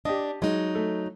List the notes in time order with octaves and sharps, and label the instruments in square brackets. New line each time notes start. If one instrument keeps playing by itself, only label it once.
[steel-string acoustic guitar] D4 [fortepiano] G4 D#5
[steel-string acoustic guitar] F#3 D#4 [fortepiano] G#3
[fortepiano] A3